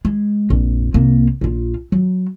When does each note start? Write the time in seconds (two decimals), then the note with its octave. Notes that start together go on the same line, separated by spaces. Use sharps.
0.05 G#3
0.50 A#1 F2
0.94 C2 A#3
1.41 A#1 F4
1.92 F#3